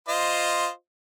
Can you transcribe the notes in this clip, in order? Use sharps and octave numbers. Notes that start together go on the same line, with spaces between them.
F4 C5 D#5